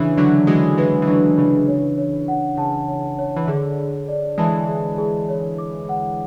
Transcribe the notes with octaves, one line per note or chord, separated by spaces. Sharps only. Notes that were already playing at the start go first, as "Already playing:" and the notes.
Already playing: C#3 E3 D4
D3 F#3 D4
E3 G#3 F#4
E3 G#3 B4
E3
D3 F#3 D4
C#3 E3 D4
C#5
C#5
F#5
C#3 A5
C#5
C#5
E3
D3 G#4
G#4
D5
E3 G#3 A5
G#4
G#4
C#5
D6
F#5